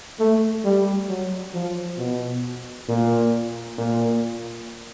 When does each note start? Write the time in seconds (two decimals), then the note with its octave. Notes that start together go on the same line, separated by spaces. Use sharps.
0.19 A3
0.64 G3
1.09 F#3
1.54 F3
1.98 B2
2.88 A#2
3.78 A#2